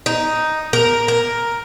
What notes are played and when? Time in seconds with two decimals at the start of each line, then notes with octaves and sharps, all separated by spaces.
0.06 D#4
0.73 A#4
1.08 A#4